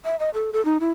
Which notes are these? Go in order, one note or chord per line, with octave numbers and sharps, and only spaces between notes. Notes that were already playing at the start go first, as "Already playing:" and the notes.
E5
D#5
A4
A4
D#4
E4